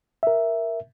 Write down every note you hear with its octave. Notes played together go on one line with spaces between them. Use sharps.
A#4 E5